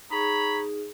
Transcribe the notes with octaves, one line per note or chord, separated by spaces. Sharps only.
D#4 G#4 C#5 A#5 B5